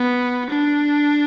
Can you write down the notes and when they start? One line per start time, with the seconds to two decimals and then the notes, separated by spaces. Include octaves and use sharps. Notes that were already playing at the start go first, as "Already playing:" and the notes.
Already playing: B3
0.50 D4